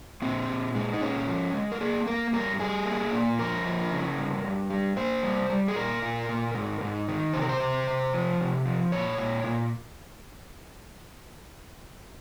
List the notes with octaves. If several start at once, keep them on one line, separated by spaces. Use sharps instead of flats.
A#2 C4
A#2
G#3
D#4
A#2 C#4
F3
G#3
A#4
A#3 G#4
A#3 A#4
G2 A#4
G3 G#4
A#3
A#2
F2 A#4
F3
C#3
G2
G2
G3
A#3 C5
G3
G3
G#4
A#2 A#4
A#2
A#2
G#2
G#2
D#3
C3 C5
A#4
C5
C3
C3
F3
C3
F3
A#2 C#5
A#2
A#2